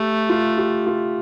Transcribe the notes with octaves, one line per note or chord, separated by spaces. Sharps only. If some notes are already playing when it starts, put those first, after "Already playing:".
Already playing: A3 G4 A4
F4
G4
F4